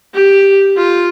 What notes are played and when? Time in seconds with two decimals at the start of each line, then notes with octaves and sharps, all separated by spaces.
0.15 G4
0.77 F4